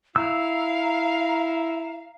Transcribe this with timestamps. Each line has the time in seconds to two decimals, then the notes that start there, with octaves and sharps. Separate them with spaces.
0.16 E4 F5 A#5 E6